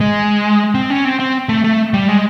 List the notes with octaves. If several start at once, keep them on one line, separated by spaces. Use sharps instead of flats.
G#3
C4
C#4
C4
C4
A3
A3
G3
G#3